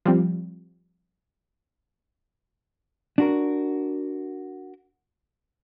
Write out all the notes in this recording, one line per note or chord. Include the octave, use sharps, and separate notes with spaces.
F3 G3 C4
D4 F#4 A#4